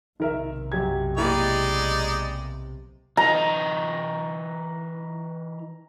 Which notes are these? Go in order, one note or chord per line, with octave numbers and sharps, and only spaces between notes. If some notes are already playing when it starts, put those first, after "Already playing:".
B1 C3 D#3 A#4 E5
F#2 G4 G#6
G#3 A#3 D#4 E4 G4 D5
E3 D#4 A#5